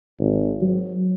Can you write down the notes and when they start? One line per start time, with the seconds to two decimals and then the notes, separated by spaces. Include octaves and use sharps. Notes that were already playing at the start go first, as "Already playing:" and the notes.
0.19 G#1
0.62 F#3